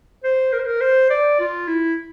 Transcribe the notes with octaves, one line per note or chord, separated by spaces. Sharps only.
C5
A#4
C5
A#4
C5
D5
F4
E4